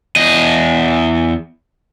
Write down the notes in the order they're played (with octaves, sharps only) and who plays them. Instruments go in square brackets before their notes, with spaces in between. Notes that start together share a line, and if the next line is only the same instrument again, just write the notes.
[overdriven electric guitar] E2 D#5